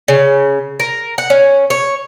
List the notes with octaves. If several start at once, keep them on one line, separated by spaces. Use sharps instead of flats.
C#3
A#4
F#5
C#4
C#5